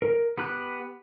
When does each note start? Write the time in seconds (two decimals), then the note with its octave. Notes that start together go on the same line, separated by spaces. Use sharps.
0.02 A#4
0.38 B3 G4 B5 F#6